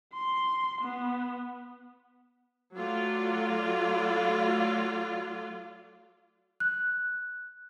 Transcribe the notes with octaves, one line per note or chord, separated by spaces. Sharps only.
C6
B3
F#3 A3 F4 D5
F#6